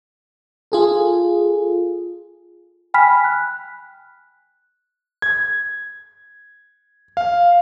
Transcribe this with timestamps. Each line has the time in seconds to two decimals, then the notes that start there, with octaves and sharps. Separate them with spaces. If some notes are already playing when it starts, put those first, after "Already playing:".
0.72 F4 G#4 A4
2.94 G5 G#5 B5 F6 B6
3.24 F#6
5.22 G#6
7.17 F5